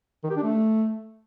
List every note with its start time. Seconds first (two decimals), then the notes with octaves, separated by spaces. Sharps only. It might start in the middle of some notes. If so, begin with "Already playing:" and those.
0.24 D#3
0.30 G4
0.36 D4
0.43 A3